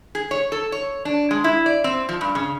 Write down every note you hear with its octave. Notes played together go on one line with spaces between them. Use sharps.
G#4
C#5
A4
C#5
D4
G#3
E4
D5
C4
F3
G2
C#3